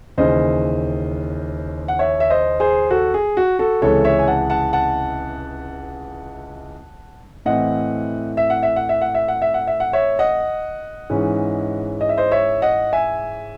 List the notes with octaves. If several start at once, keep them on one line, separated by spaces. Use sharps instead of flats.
D#2 C#3 E3 C5 D#5
F#5
C#5 E5
E5
C5 D#5
G#4 C5
F#4 A4
G#4
F#4
F#4 A4
C#2 C3 E3 G#3 A4 C#5
C#5 E5
G#5
F#5 A5
F#5 A5
F#5 A5
A2 E3 C4 D#5 F#5
E5
F#5
E5
F#5
E5
F#5
E5
F#5
E5
F#5
E5
F#5
C#5 E5
D#5 F#5
G#2 E3 G#3 C#4
D#5
E5
C5 D#5
C#5 E5
D#5 F#5
E5 G#5